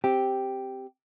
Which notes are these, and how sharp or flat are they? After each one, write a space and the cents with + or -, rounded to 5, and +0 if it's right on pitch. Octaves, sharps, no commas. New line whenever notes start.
C4 +0 G4 +0